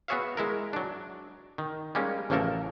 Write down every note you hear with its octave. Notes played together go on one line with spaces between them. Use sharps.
B3 F#4 G#4 C#5 E5 F5
G#3 E4 A#4
F#3 D4
D#3
G3 G#3 A#3 C#4
A1 C#3 F3 A#3 A4 A#4